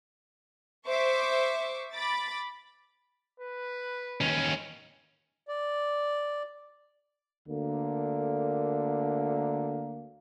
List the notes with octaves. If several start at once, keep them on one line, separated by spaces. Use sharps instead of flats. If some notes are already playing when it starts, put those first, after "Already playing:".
C5 E5 C#6 D6
B5 D6 A6
B4
D#2 C#4
D5
D2 D3 A#3